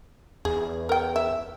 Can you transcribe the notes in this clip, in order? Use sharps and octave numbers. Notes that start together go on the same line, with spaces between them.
E2 G#4
A#4 G5
E5